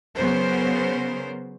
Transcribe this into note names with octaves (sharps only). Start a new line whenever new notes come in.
C#3 F#3 B3 A#4 C5